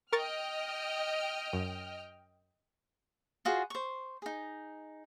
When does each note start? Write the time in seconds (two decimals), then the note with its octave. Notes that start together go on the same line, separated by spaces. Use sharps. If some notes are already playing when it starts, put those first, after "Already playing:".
0.13 A#4 D#5 G5 C#6 F6 A6
1.53 F#2
3.45 F4 F#4 G#4 C5
3.70 C5 C#6
4.22 D#4 G#4